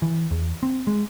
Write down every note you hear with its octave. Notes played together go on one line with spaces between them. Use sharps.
E3
E2
C4
G#3